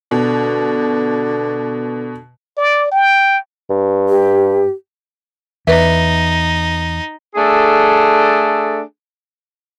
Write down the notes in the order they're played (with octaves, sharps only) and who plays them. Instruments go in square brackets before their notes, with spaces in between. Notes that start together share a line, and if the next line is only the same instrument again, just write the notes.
[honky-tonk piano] B2 [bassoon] D3
[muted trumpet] D5
G5
[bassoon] G2
[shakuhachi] G4
[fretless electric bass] E2 [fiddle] D#4 [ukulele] B4 D5 E5
[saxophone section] A3 D4 G#4 A4